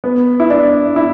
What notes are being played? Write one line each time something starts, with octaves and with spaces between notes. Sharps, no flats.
B3
E4
D4
E4